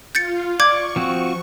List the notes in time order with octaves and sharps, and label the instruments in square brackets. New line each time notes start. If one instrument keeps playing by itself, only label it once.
[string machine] F4 [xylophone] G6 A6 C#7
[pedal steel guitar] D5 [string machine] C#6 [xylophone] D6 G6 G#6
[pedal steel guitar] F3 C4 F#4